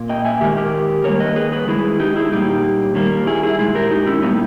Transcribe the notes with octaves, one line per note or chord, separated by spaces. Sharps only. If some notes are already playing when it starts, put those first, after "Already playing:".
Already playing: A#2 A#3
D#5 G5
E5 G#5
D#3 G#3 G4 A#4
G4 A#4
D#3 G3 A#3 A#4 C#5
B4 D#5
G#4 B4
G#4 B4
D#3 G#3 E4 G#4
D#4 G4
E4 G#4
A#2 G3 A#3 D#4 G4
D#3 G3 A#3
E4 G#4
E4 G#4
A#2 G#3 E4 G#4
G4 A#4
D#4 G4
C#4 E4
A#2 G3 A#3 B3 D#4